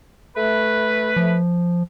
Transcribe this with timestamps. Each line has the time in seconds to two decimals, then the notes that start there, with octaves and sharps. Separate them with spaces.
0.37 A3 B4
1.17 F3